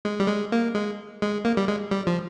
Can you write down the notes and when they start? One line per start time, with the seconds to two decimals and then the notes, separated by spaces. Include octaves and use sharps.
0.05 G#3
0.20 G3
0.28 G#3
0.52 A#3
0.75 G#3
1.22 G#3
1.45 A#3
1.57 G3
1.68 G#3
1.91 G3
2.07 F3